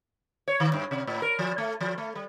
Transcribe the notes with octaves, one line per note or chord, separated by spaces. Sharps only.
C#5
D#3
G2
C3
A2
A#4
F3
A3
F3
A3
G3